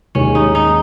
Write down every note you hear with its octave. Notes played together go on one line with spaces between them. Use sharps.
D#2 D#3 G#3 C#4
D#4
D#4